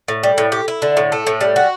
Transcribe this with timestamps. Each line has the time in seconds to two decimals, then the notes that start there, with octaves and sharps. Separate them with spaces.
0.08 A2
0.23 G3
0.38 A2
0.52 G4
0.68 E4
0.82 D3
0.97 A2
1.12 A3
1.27 A2
1.41 G3
1.56 F#4